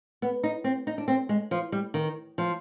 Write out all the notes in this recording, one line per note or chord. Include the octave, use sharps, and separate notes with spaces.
B3
D#4
C4
D#4
D4
C4
G#3
F3
G3
D#3
F3